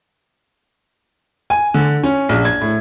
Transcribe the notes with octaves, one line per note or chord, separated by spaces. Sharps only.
G#5
D3
C#4
A#1
G#6
A2